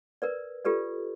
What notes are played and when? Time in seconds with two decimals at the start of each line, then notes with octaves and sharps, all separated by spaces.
0.22 A#4 B4 D5
0.65 F4 G4 A4 B4 D5